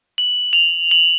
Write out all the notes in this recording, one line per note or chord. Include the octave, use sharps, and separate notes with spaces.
F#7
F7
F#7